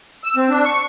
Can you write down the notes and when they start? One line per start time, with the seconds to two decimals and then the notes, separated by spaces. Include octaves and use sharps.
0.24 E6
0.36 C4
0.50 D4
0.65 C#6